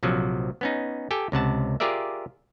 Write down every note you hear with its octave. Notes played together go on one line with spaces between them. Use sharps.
A#1 C3 F3 F#3
B3 C#4 D#4
G4 A4 G5 G#5
C#2 C3 F#5 A5
F4 G4 G#4 A#4 D5 E5